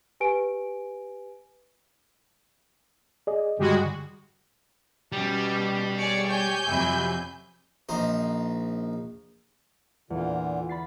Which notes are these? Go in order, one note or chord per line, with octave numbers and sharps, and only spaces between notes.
G4 B4 G#5 D7
G#4 D5 D#5
G2 D3 G3 G#3 F#4
B2 G3 C#4 G4
G#4 C#5 D5 C#7
G4 C#5 G#5 G6
F2 C3 F#3 E5 B5
A#1 D#4 C5
E2 A#2 D3
B5 A6 C7